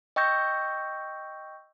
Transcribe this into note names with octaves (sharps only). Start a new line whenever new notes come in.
D#5 G5 C#6 E6 G6 A#6